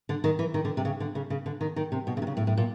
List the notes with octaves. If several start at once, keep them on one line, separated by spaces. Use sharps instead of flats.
D3
D#3
E3
D#3
D3
C3
C#3
D3
C#3
C#3
D3
D#3
D#3
C3
B2
C#3
C3
C#3
A2
A2
A#2